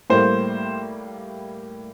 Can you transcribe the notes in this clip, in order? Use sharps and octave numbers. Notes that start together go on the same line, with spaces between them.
A2 G3 A#3 C5